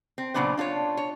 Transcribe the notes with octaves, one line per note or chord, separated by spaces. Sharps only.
C4
A#2 C#3 F#3 B3 D4 C5
D4 F4 G#4 C#5
C#5